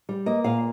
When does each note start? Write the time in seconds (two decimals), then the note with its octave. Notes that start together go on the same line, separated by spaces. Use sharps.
0.09 G3
0.26 A#3 D#5
0.44 A#2 F5